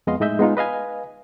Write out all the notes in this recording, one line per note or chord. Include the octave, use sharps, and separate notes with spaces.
F2 G#3 B3 D#5 F5 C6
A2 G#3 D#4 D#5 E5 G6
G#3 B3 D#4 F4
B4 D#5 F5 G#5